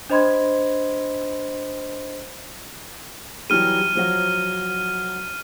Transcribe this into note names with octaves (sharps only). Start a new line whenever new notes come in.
D4 C5 D#5 B5 C6 G#6
E3 F#3 G3 F6 D#7
F3 F#3 F#4